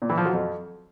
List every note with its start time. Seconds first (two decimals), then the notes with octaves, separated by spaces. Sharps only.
0.02 A#2
0.10 E3
0.17 F3
0.25 F#3
0.33 F2